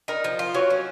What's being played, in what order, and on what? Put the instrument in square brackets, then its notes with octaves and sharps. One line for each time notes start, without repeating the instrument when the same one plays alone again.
[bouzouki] D#4 [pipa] A#4
[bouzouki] F3
F4
[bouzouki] F#3 [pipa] C#5
[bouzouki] C#4